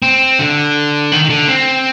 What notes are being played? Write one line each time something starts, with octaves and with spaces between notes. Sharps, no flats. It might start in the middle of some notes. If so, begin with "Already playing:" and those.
C4
D3
D#3
D#3
D3
C4